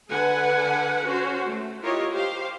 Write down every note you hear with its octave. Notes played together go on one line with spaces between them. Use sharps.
D3 A4 B4 F#5 G#5
C#4 F#4 C5
A3
E4 F4 G4 A#4 C#5 D#5
G4 C5 F5